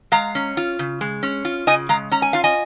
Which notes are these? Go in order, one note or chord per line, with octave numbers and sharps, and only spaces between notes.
G#3 F5 A#5
C#4
F4
C#3
G#3
C#4
F4
C#3 D#5 G#5
G#3 F5 A#5
C#4 A#5
G#5
F4 F5
D#5 G#5